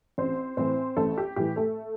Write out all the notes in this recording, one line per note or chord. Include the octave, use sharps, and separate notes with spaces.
A1 C4 C5
A2 E3 C4 C5
A1 A3 A4
G4
A2 E3 G4
A3 A4